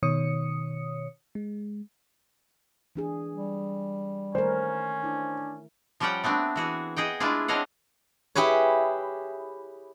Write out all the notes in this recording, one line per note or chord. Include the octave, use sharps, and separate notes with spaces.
B2 D#3 C#5 D#6 C#7
G#3
E3 D4 G#4
G3
D#3 A3 C#4 A#4 C5
D4 E4
F3 G3 C#4 D5 F#5 G5
A3 B3 C4 D4
E3 F#4 G#4
G#4 D#5 F#5 G5
G#3 A3 D4 E4 F4 G#4
C4 D4 C#5 D#5 F5 F#5
E4 G4 G#4 B4 C#5